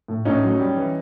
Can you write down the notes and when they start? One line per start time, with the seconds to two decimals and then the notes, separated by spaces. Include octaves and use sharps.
0.08 A2
0.25 A2 C#4 D#4
0.43 F#3
0.60 G3
0.77 E3